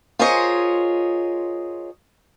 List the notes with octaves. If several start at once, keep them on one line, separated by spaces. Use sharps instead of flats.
F4 G#4 A#4 C5 C#5 D#5